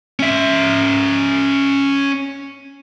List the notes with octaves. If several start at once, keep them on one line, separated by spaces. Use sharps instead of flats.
C#4 E5